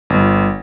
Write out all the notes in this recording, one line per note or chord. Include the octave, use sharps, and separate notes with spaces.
G1